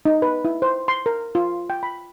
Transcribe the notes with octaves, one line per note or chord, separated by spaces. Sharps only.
D#4
B4
E4
C5
C6
A#4
F4
G5
B5